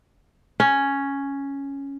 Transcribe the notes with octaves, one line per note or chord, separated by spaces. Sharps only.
C#4